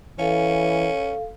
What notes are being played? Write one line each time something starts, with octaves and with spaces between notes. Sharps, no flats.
E3 C#4 A4 F5